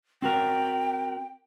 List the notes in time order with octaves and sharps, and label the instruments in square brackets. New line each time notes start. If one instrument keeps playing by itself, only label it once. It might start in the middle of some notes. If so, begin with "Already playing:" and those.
[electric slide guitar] C4 F#4 A#4 [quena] G5